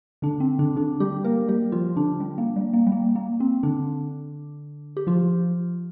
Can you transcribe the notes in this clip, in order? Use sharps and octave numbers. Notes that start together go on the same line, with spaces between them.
D3 D4
C4
D3 D4
D3 D4
G3 G4
A#3 A#4
G3 G4
F3 F4
D3 D4
G3
A#3
G3
A#3
G3
A#3
A#3
C4
D3 D4
G4
F3 F4